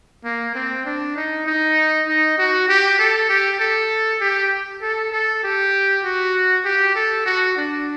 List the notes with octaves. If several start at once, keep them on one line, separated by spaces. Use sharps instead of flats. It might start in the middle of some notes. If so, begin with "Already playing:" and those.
A#3
C4
D4
D#4
D#4
D#4
F#4
G4
A4
G4
A4
G4
A4
A4
G4
F#4
G4
A4
F#4
D4